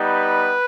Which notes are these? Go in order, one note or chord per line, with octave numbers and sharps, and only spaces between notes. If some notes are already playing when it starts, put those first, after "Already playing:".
Already playing: G3 B3 D#4 B4